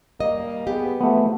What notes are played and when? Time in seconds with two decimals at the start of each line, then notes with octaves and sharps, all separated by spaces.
0.20 G3 A#3 D#5
0.67 B3 G4 G#4
1.01 E3 F3 A3 B3